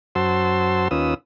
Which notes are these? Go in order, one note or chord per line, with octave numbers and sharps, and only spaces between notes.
F#2 F#4 C5 A5 C6 E6
D#2 C#4 F4 B4 D#6 E6